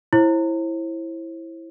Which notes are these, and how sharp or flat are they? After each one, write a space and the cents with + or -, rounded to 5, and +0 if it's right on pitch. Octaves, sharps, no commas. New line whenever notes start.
E4 +5 C5 +40